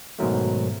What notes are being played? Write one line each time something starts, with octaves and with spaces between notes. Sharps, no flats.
G#2 B2 D#3 F#3 A3